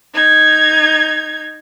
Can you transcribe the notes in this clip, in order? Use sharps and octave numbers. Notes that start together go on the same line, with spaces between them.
D#4 G#6